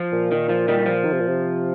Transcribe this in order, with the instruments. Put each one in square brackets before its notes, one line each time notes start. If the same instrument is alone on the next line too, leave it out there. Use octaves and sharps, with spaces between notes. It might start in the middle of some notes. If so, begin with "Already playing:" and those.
Already playing: [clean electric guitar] F3
[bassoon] A#2
[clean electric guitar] D#3
F3
D#3 G3
D#3
F3
[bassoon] D#3
C3
A#2
C3